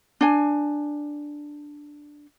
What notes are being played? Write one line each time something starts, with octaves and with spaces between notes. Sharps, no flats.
D4 G#5